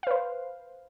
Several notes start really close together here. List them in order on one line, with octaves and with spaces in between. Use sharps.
F5 B4 C5